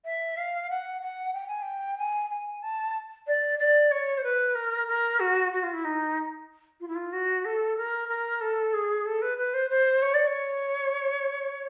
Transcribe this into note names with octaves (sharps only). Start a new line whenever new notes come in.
E5
F5
F#5
F#5
G5
G#5
G5
G#5
G#5
A5
D5
D5
C#5
C5
B4
A#4
A#4
F#4
F#4
F4
E4
D#4
F4
E4
F4
F#4
A4
A#4
A#4
A4
G#4
A4
B4
B4
C5
C5
C#5
D5
C#5